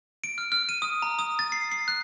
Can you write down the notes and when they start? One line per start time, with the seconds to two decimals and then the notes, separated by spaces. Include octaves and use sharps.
0.24 D7
0.38 F6
0.52 F6
0.69 D#7
0.82 D#6
1.02 A#5
1.19 D#6
1.39 A6
1.52 C7
1.72 C7
1.88 F#6